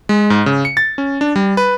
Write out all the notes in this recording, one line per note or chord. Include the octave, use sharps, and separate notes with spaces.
G#3
G#2
C#3
C#7
A6
C#4
D4
G3
B4